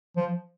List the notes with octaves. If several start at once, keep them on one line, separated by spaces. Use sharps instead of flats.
F3